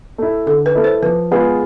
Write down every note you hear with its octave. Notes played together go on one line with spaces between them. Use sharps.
A3 E4
D3 A4
B4
A3 E4
C5
F3 B4
G#3 B3 F4 G#4 B4